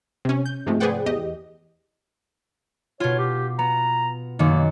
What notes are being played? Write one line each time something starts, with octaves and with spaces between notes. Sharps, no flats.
C3 C#4
G6
G#2 C3 F3 G#3 A3
G#4 B4 C5 D5 F#5 G5
E2 G4 D#5
B2 F4 C#5
G4
B3 A#5
F#2 D#3 A#3